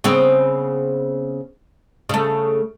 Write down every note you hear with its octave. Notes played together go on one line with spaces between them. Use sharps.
C#3 B3 C4
C#3 A3